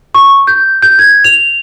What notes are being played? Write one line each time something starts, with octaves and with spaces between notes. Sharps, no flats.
C#6
G6
G6
G#6
F7